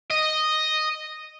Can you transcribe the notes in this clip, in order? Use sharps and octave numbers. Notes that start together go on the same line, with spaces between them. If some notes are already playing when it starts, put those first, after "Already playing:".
D#5